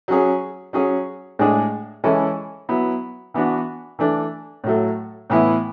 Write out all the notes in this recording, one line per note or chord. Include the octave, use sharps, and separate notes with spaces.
F#3 C#4 G#4
F#3 C#4 G#4
A2 G#3 D4 G#4
E3 G#3 C#4 E4 A4
F#3 B3 E4
E3 B3 D4 F#4
E3 A3 D4
A2 F#3 A3
A2 E3 B3 E4